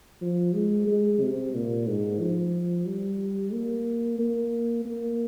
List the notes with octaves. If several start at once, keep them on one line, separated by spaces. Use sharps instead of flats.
F3
G#3
G#3
C3
A#2
G#2
F3
G3
A#3
A#3
A#3